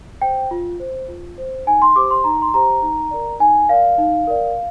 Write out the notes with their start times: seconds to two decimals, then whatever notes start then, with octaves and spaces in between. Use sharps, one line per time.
0.22 C5 G5
0.51 F4
0.80 C5
1.08 F4
1.38 C5
1.67 D#4 G#5
1.82 C6
1.96 G4 C5 D6
2.11 C6
2.24 D#4 A#5
2.42 C6
2.54 G4 C5 A#5
2.82 D#4
3.11 A#4 D5
3.40 D#4 G#5
3.69 A#4 D5 F5
3.98 D#4
4.27 A#4 D5